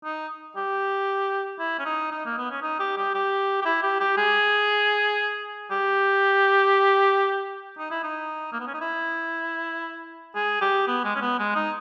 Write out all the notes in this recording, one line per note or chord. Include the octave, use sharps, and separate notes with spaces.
D#4
G4
E4
C#4
D#4
D#4
A#3
B3
C#4
D#4
G4
G4
G4
G4
E4
G4
G4
G#4
G4
D#4
E4
D#4
A#3
B3
C#4
D#4
E4
G#4
G4
B3
G#3
C#4
B3
G#3
D#4